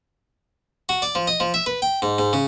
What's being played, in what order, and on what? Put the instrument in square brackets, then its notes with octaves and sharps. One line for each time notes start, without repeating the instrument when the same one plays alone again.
[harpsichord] F#4
D5
F3
D#5
F3
E5
B4
G5
G#2
G#2
C#3